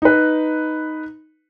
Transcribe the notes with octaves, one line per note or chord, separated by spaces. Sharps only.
D#4 B4